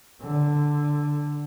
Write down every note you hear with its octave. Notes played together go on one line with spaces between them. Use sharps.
D3